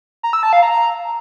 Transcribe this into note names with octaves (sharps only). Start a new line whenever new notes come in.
A#5
E6
A5
F5
A#5